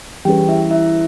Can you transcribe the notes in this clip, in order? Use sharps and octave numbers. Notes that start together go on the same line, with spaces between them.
E3 G3 C#4 G4 G#4 B4 G5
E4 E5
E4 E5